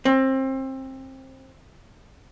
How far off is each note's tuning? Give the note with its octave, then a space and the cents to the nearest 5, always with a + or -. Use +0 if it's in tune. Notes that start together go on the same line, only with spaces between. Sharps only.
C4 +25